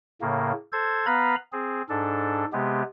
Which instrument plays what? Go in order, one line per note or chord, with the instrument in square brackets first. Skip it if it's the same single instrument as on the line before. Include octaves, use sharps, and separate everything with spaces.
[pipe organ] A2 C#3 A#3
A4 C5 G#6
B3 B4 F5 A#5 B5
C4 G#4
G#2 D4 A4
C3 G#3 B3 G4